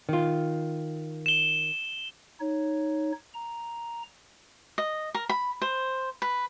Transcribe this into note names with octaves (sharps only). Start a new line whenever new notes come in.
D#3 F4
E7 G7
D#4 C#5
A#5
D#5
A#4
B5
C5
B4